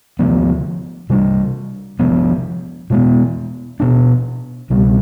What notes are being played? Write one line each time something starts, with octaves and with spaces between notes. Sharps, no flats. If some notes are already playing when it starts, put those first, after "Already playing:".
D2 C3 F3 B3
C3 G3 D4
C3 F3 B3
B2 G#3 B3
B2 B3 D4
C2 B2 G3